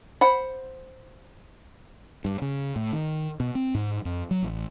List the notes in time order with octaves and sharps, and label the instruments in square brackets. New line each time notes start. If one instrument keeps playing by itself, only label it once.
[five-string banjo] C5 F#5 B5
[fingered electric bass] G2
C#3
A2
D#3
B2
C4
G#2
F2
F#3
A1